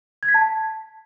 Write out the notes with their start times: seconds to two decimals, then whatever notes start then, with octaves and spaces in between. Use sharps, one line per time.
0.23 G#6
0.28 B6
0.34 A5